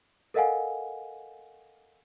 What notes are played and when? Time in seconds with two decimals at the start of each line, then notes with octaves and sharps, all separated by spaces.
0.34 A4 A#4 D#5 F5 F#5 G#5